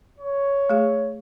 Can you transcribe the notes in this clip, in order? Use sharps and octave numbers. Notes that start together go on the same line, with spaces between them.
C#5
A3 G#4